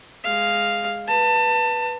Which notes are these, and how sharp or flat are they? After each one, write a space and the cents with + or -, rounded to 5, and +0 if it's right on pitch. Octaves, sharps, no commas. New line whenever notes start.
G#3 +0 F5 +0
B4 -10 A5 +25